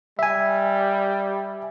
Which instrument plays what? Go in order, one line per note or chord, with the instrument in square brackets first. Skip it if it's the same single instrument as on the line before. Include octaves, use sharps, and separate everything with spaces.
[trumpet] G3 [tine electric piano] E5 G#5